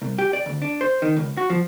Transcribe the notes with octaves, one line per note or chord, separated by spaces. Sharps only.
C2
G4
D5
D2
D4
C5
D#3
C#2
F#4
F3